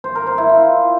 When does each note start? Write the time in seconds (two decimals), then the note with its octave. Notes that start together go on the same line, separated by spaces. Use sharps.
0.04 C5
0.15 A#4
0.27 C5
0.38 E4
0.49 F4